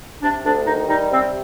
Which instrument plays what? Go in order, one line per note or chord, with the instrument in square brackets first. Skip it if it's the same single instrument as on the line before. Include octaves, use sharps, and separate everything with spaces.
[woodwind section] C3 D4
D2 D4
D#3 D#4
G3 D#4
C3 C4